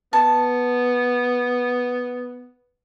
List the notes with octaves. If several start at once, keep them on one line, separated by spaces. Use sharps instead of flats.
B3 A5